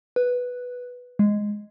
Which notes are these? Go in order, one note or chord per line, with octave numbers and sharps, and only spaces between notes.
B4
G#3